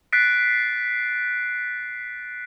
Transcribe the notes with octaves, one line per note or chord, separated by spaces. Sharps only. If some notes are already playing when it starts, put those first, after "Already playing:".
F#6 A6 B6 C7 D7